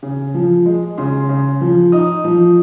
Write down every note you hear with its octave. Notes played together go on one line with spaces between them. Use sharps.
C#3
F3
G#3
C#3 C6
C#3
F3
D#4 D#6
F3